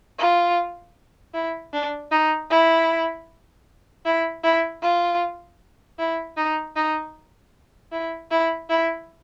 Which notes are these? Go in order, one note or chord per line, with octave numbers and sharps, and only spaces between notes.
F4
E4
D4
D#4
E4
E4
E4
F4
E4
D#4
D#4
E4
E4
E4